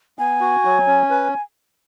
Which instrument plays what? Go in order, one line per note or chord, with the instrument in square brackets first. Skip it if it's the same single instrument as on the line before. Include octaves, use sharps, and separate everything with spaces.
[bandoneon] B3 [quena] G#5
[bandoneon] F#4
F#3
C#4
B4